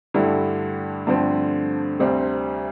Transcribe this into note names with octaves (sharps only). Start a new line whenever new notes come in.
G2 D3 A3 E4 G4
G2 D3 F3 A3 C4
D2 C3 G3 C4